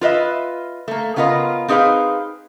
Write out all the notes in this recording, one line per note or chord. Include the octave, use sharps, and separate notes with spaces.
F4 B4 D#5 E5
A3 A#3
C#3 B3 F4 A#4 D#5
C4 D#4 G#4 B4 F5